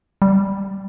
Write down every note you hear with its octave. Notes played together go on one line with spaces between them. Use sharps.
G3